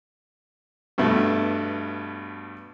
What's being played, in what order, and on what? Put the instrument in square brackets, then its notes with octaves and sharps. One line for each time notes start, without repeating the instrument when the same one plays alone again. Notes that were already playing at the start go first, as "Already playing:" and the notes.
[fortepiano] G2 B2 A3